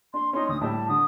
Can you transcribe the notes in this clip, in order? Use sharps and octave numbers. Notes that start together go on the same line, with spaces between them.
D4 C6
C#4 D#4 C6
D2 D#6
A2 G3 A5
D3 D#6